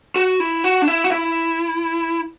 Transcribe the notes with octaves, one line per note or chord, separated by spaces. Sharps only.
F#4
E4
F#4
D4
E4
F#4
E4